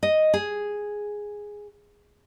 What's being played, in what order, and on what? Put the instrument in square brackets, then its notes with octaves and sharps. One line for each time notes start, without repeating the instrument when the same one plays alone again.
[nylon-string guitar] D#5
G#4